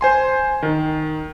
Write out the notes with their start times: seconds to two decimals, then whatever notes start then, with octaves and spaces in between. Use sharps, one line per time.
0.01 C5 G#5 C6
0.63 D#3